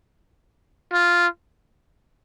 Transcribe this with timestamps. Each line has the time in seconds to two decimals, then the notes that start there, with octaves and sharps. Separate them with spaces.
0.93 F4